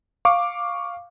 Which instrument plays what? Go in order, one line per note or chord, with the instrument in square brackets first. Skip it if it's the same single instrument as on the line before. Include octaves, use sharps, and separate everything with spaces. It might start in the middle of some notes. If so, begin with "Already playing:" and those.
[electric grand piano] F5 C#6 D6